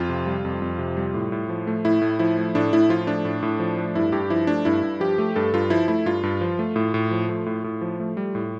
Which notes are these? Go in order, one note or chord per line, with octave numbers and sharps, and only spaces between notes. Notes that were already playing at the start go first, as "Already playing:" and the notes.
Already playing: F2 F4
C3
G3
F2
F2
C3
G3
A2
A2
F3
A3
A2 E4
A2
F3 E4
A3
A2 D4
A2 E4
F3 F4
A3 D4
A2
A2
F3
A3
G2 E4
G2 G4
F3 E4
A3 D4
G2 E4
G2
F3 G4
A3
G2 A4
G2 F4
F3 E4
A3 E4
G2 F4
G2
F3
A3
A2
A2
F3
A3
A2
A2
F3
A3
G3
A2